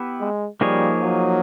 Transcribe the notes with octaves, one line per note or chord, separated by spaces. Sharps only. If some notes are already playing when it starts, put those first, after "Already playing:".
Already playing: B3 E4 G4 B4
G#3
F3 G3 A#3 D#4 G#4 C#5
F#3